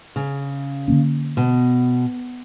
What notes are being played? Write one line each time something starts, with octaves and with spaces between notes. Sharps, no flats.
C#3
D3 A#3 C#4
B2